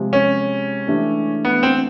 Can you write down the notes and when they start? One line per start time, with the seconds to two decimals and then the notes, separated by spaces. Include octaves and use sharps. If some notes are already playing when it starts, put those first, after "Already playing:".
Already playing: C3 F3 G#3
0.13 C#4
0.87 E3 A3 D4 G4
1.45 B3
1.63 C4